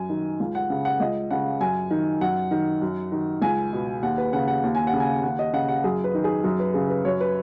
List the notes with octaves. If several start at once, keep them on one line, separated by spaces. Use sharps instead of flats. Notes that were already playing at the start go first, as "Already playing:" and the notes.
Already playing: F#2 G#5
D#3
C#2
F#5
C#3
F#5
C#2 D#5
C#3 F#5
F#2 G#5
D#3
F#2 F#5
D#3
F#2
D#3
C#2 G#5
B2
D#2 F#5
B4
C#3 F#5
F#5
D#2
G#5
F#5
C#3
G#5
D#2 F#5
D#5
C#3 F#5
F#5
F#2 G#4
B4
D#3
G#4
F#2 G#4
B4
C#3 G#4
B4
F#2 C#5
B4